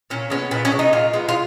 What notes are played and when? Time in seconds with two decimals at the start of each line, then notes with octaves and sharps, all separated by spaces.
0.10 A#2 C#4
0.30 G#3 B3 C#4
0.51 A#2 B3
0.65 C#4
0.72 G#3 B3
0.79 D#4
0.93 A#2 F4
1.13 G#3 B3
1.29 F4